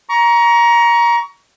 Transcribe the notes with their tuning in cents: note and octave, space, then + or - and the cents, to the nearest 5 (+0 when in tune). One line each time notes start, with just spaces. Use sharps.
A#5 +20 C#6 +30